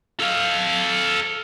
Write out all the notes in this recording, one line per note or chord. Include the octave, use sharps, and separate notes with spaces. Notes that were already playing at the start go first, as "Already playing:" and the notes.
A4 F5